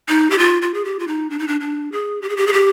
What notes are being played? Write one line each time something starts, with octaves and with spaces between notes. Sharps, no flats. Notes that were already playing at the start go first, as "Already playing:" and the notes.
D#4
G4
F4
F4
G#4
G4
F4
D#4
D4
D#4
D4
D4
G#4
G4
G#4
G4
G#4
G4